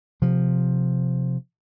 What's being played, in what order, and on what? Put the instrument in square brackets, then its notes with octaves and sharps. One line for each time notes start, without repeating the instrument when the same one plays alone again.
[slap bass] C3 F3